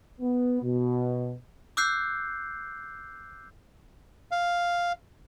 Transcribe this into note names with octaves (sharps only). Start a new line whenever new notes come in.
B3
B2
D6 E6 F#6 G6 C7
F5